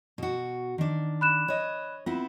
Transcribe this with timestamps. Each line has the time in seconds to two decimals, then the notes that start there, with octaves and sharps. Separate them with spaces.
0.18 B2 F#4
0.78 D#3 D4
1.21 B5 F#6 E7
1.48 C#5 D#5
2.06 B3 C4 E4 F4